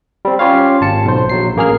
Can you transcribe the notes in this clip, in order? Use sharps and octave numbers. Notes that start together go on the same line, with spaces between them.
G3 C4
C#4 F4 G4 C#5 F5
G#1 A5 C#7
B1 C5
A#1 F#3 C7
A1 A#3 G#4 F6